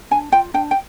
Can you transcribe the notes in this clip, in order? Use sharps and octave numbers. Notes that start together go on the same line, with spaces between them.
D4 G#5
F4 G5
D4 G5
G5